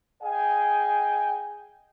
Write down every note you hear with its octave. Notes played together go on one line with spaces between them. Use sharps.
G#4 D#5 F5 G5 G#5